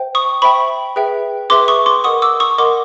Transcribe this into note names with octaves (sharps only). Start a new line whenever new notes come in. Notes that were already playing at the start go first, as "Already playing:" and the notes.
Already playing: C5 E5 G5
C#6 D#6
C5 E5 G5 B5 C#6
G#4 B4 E5 G5
G#4 B4 E5 G5 C6 D6
C#6 D#6
C6 D6
A#4 D#5 F#5 C#6 D#6
D6 E6
C#6 D#6
A#4 D#5 F#5 C6 D6